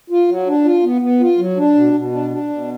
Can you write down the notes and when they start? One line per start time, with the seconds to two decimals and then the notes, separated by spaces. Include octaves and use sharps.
0.10 F4
0.28 F#3
0.47 D4
0.64 F4
0.83 B3
1.01 B3
1.20 F4
1.38 F#3
1.57 D4
1.75 B2
1.94 B2
2.12 D4
2.31 D4
2.49 B2